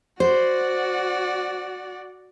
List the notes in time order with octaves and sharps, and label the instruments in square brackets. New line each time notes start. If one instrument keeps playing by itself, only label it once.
[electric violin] F#4 D5 [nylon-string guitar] C5